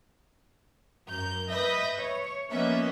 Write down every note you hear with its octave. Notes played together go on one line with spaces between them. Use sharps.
F#2 A#4 G6
B4 D#5 E5 G6 A#6
C#5
F3 A#3 B3 C#4 D#5 E5